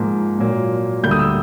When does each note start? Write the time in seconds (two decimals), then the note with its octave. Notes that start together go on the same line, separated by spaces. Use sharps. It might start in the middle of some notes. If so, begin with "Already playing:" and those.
Already playing: G#2 F3 A#3
0.38 A#2 F#3 A#3
1.03 D2 D3 G3 A#3 G6
1.11 D#6
1.19 E6